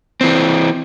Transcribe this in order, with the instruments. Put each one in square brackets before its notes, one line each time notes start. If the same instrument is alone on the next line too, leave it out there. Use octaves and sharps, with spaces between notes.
[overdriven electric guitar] E3 C4